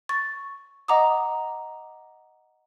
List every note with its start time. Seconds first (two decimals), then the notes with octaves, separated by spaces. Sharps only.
0.09 C#6 A6
0.88 D#5 F#5 A#5 D6 D#6